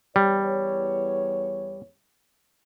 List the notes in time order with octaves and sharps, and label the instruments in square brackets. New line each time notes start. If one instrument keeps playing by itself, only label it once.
[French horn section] E2 C#5 [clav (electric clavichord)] G3